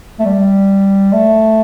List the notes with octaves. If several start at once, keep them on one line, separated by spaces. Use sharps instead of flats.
A3
G3
A3